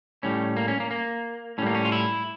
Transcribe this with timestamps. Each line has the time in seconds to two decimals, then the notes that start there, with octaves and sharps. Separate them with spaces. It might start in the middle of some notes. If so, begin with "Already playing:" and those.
0.23 A2 G3 C#4
0.57 A#3
0.68 C#4
0.80 A#3
0.91 A#3
1.58 A2 C#4
1.62 G3 A#3
1.75 C#4
1.85 F4
1.92 E4